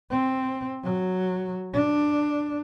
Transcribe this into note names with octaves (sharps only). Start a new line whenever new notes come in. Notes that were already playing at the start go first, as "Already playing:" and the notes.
C4
F#3
D4